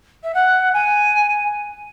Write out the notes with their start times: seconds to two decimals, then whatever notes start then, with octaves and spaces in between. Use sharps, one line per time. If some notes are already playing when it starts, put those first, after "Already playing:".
0.23 E5
0.34 F#5
0.74 G#5